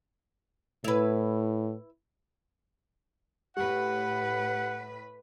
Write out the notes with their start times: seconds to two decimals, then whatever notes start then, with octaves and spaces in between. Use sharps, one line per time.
0.84 A2 E4 B4
3.57 A2 G4 B4 F#5